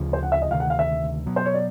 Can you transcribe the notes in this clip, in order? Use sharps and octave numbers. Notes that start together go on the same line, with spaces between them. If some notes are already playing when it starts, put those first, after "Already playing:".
Already playing: D2 C#3 F3
C5
F#5
E5
D#5
D2 C3 D#3 F5
F#5
F5
E5
B2 F#3 B3
C5
C#5
D5